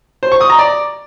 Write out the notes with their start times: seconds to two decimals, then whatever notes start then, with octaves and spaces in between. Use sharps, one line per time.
0.23 C5
0.32 C#6
0.41 D#6
0.50 A#5
0.59 D5